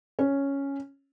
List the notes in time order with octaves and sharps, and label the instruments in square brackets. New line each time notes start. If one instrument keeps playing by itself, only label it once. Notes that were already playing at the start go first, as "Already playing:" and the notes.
[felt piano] C#4